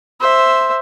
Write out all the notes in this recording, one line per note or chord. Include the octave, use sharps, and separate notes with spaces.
C5 E5